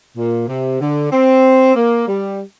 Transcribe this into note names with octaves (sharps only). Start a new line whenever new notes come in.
A#2
C3
D3
C4
A#3
G3